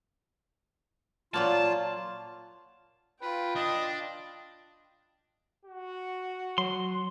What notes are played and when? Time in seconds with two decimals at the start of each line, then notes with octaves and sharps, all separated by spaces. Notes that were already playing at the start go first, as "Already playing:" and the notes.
1.34 A#2 F#3 A#3 F4 A5
3.22 F4 B4 G5
3.56 D4 D#5
5.65 F#4
6.58 F#3 C6